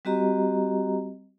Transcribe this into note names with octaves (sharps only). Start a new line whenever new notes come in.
G3 C4 F#4 G4 D#5 A#5